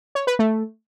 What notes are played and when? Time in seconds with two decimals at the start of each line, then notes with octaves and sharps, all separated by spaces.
0.15 C#5
0.27 B4
0.39 A3